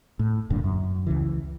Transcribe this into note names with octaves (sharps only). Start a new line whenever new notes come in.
A2
E1 G2 A#2 D3
F#2
C#2 C#3 E3